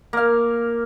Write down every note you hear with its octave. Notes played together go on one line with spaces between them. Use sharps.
A#3 F5